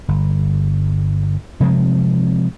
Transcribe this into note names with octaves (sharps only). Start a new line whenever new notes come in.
G1
C3 F3 G#3 C4